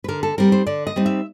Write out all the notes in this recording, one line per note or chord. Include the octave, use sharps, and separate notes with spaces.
B4
D3 A#4
A4
G3 C4 D#4 A#4
C5
D3 D5
D#5
G3 C4 D#4
E5